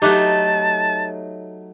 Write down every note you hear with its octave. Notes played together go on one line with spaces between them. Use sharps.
F#3 A3 D#4 G4 A5 D6 F#6